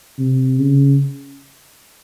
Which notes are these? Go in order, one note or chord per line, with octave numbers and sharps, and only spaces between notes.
C3
C#3